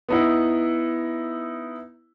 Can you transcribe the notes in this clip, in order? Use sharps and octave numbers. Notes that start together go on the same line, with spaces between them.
B3 D#4 E4